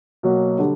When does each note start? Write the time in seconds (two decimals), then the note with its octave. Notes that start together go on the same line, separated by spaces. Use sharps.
0.23 B2 F#3 A#3
0.59 D3 G3